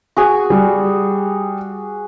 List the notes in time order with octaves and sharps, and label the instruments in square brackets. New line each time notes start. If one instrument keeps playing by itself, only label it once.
[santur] F#4 G#4 G#5
[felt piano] G3